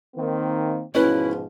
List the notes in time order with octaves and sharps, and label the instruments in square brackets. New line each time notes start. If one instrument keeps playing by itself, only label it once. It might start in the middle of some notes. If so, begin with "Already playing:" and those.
[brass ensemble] D#3 A#3 C4
[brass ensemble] G#2 B2 F3 [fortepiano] C#4 B4 [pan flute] E4